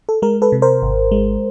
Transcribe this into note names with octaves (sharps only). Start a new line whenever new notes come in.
A4
G#3 A#4
A4 B4
C3
A#4 C5
G#1
G#3